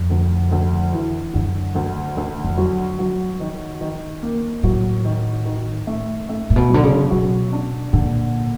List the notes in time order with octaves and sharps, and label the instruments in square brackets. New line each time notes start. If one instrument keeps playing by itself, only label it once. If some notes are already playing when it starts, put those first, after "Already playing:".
Already playing: [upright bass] F2
[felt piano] D2
D2
E3
[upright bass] F#2 [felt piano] D3
[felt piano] D2
D2
[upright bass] F2
[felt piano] F#3
F#3
D#3
D#3
A#3
[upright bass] A2 [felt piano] F#3
[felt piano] D#3
D#3
A3
A3
[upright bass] A#2
B2
[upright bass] D3 [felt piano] F#3
[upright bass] C#3
[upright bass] B2 [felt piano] F#3
[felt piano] D4
[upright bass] A#2 [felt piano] D3